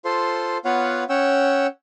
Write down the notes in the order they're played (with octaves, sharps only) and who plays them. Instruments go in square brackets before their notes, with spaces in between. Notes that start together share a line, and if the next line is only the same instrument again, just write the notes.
[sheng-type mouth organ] F4 A4 C5 C6
B3 F4 B4 C#5 F5 F#5
C#4 C#5 F#5 G5 E6